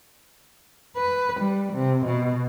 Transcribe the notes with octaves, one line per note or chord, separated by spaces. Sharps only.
B4
G3
C3
B2